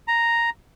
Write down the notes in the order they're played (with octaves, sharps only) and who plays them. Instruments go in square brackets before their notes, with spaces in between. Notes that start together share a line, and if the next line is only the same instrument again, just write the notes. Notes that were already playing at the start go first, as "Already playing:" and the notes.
[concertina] A#5